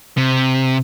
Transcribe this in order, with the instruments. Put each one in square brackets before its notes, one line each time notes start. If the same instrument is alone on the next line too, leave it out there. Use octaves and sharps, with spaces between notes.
[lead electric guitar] C3